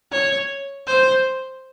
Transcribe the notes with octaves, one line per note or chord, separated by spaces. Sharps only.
C#5
C5